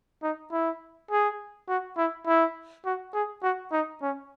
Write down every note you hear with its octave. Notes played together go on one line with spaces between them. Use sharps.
D#4
E4
G#4
F#4
E4
E4
F#4
G#4
F#4
D#4
C#4